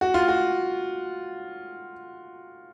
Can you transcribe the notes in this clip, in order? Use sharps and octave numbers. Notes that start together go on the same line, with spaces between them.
F#4
F4
F#4